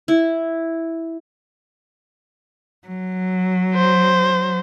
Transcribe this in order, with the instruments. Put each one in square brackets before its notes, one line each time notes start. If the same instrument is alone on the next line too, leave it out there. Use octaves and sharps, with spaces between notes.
[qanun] E4
[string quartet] F#3
[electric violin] C5